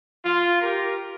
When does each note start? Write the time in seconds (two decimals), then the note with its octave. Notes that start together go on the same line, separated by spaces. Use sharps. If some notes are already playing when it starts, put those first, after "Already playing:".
0.24 F4
0.61 G4 A#4